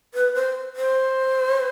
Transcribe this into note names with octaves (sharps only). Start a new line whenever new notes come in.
B4
C5
C5